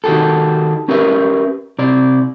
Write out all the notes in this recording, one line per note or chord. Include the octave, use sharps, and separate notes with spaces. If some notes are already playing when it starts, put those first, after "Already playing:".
D#3 F#4 G4 A4
C#4 G4 A#4 B4 E5
C3 D5